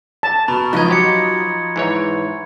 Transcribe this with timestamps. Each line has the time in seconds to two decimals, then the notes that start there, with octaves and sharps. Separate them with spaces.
0.23 A5
0.48 B2 A#5 B5 C#6
0.73 C#2 F3 D#4 D#5 F#6 G#6
0.88 F#3 G4 C6 G#6 C#7
1.76 G#2 E3 C#5